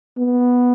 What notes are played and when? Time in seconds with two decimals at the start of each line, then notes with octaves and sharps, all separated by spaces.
0.18 B3